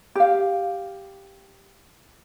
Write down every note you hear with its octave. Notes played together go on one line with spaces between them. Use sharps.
G4 F5